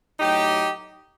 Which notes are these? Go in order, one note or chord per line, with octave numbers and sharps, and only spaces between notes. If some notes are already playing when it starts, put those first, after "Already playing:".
A2 F#3 D#4 G4